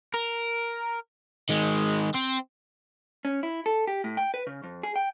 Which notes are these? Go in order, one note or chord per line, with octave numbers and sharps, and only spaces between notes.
A#4
D#3 G#3
C4
C#4
E4
A4
G4
A2
G5
B4
C#3
F2
G#4
G5